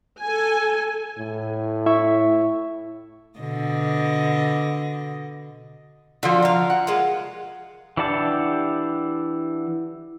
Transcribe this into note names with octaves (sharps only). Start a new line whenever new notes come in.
A4 G#5
A2
E4 E5 C#6
B2 D3 D#5
D3 F3 F4 F#4
A#4 F5
F#5
G#3 A#3 F4
E3 D4 G4 F#5 A5